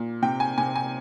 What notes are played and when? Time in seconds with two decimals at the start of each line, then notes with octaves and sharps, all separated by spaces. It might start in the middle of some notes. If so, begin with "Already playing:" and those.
Already playing: A#2
0.22 C3 G5
0.40 G#5
0.58 C3 G#5
0.75 G#5